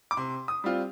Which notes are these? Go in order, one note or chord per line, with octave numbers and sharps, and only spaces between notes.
D6
C3 C6
D#6
G3 C4 F4